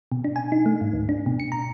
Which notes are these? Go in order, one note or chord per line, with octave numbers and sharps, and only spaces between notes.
B2
D4
G#5
D#4
A3
G#2
D2
D4
B2
C#7
A#5